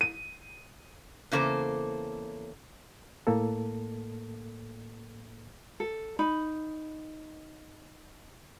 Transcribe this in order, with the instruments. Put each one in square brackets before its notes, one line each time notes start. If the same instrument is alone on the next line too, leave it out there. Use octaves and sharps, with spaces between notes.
[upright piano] D#7
[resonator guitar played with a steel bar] E2 C#3 A#3 A4 C5
[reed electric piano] A2 A#3 A4
[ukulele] A4
D#4 B5